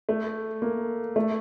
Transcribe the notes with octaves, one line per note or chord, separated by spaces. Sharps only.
A3
A#3
A3